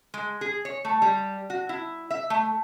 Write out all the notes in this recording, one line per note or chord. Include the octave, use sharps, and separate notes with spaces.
G#3
G#4
C#5
A3
G3
F#4
E4
E5
A3